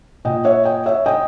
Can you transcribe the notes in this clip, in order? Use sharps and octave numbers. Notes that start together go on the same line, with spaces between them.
A#2 D#5 G5
C#5 E5
D#5 G5
C#5 E5
D#5 G5